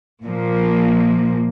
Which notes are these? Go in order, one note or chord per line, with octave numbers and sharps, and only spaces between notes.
A#2 F3 A#3